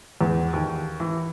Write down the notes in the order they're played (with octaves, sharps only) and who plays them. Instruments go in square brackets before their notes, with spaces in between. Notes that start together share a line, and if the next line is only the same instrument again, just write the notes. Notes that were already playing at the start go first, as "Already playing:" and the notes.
[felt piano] E2
D#2
E3